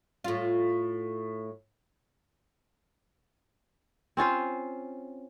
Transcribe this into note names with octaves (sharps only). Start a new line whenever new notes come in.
A2 F4
C4 C#4 F4 C5